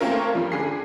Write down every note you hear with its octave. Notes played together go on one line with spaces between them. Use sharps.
A3 A#3 C4 C#4 F4 A#4
G2 F3 G3
D3 G#4 C7